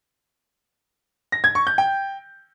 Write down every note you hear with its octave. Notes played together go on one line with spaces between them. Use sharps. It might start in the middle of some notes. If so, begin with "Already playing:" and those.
A#6
G#6
C#6
G6
G5